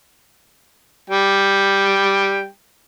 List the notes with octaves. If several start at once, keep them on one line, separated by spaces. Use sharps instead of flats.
G3 G5